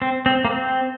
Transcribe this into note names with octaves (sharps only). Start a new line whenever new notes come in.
C4
C4
A#3
C4